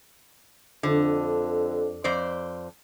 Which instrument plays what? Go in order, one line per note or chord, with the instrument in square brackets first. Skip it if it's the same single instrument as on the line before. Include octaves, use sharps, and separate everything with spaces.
[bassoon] F2 [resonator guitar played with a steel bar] D3
[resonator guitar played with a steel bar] F2 C5 D5